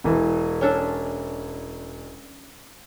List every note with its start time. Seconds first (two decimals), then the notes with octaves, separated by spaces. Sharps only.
0.04 E1 E3
0.61 C#4 D4 A4